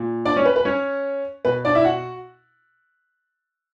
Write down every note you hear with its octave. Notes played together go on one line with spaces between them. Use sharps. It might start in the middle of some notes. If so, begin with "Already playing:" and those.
Already playing: A#2
D4 D5
C#4 C#5
B4
B4
C#4 C#5
B2 B4
D4 D5
E4 E5
F#4 F#5